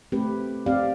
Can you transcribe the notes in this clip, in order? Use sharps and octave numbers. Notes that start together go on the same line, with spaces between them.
A3 C4 G4 B4
C4 G4 D5 F5